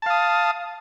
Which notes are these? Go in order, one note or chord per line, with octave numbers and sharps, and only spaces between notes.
F5 A5 D#6